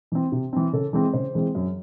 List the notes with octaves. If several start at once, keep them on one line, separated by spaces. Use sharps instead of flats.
E3 C4
C3
E3 C4
C#3 A4
E3 G#3 C4
C#3 C5
E3 G#3 C4
F#2